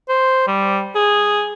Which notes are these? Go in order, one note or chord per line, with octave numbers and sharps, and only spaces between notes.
C5
G3
G#4